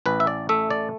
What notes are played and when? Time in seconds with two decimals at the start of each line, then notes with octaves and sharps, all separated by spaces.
0.06 A1 B4
0.20 E5
0.27 D5
0.49 A3 E5
0.70 D5